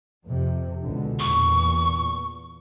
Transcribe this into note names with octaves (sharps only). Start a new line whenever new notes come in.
F2 C3
C#2 B2 D3
E2 A#2 C#6